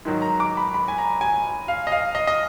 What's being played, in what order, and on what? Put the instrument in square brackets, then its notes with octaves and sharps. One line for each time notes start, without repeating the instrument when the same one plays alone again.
[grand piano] G#2 D#3 F#3
A#5
D6
B5
B5
G#5
A#5
G#5
F5
D#5
F5
D#5
D#5